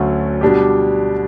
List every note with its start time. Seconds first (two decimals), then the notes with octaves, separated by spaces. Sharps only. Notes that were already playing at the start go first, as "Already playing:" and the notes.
Already playing: D2 D3 F#3 A3 C#4
0.41 B2 G3 D4 G4